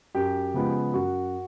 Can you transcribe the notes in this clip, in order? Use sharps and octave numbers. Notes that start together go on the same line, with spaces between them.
F#2 G4
C#3 F3 G#3 B3
F#2 F#4